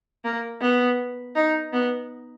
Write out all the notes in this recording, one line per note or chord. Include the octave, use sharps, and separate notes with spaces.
A#3
B3
D#4
B3